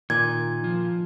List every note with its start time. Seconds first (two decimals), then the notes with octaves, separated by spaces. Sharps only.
0.10 A#2 D#3 G#6
0.64 F3